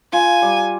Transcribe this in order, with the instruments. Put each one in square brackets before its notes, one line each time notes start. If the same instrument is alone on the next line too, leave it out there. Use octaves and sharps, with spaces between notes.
[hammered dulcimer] F4 [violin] G#5
[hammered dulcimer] G3